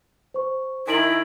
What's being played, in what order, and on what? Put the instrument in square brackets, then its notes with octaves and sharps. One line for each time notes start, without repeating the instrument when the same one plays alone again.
[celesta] C5 C#6
[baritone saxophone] D#3 [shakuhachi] E4 [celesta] G#5 D7 F#7